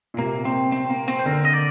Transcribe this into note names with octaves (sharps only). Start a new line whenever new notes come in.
A#2
C3 A#3
C4
C4
A#3
C4
C5
D3 A#4
D#5
D5